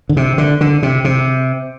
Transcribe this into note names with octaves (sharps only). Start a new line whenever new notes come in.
D3
C3
D3
D3
C3
C3